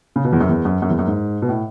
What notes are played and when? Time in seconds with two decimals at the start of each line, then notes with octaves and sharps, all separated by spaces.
0.16 C#3
0.24 B2
0.33 E2
0.40 F#2
0.49 E2
0.65 F#2
0.82 F#2
0.90 E2
0.99 F#2
1.07 G#2
1.42 B2
1.49 A2